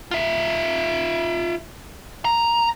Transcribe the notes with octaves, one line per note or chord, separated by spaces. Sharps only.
F4 E5
A#5